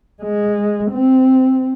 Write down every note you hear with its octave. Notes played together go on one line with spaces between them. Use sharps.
G#3
C4